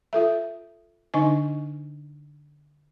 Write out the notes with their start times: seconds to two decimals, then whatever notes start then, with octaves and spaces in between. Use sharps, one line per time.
0.13 F4 A4 E5
1.14 D3 D4 D#4 D#5 G#5